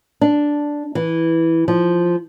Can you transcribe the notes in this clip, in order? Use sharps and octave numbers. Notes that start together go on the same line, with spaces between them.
D4
E3
F3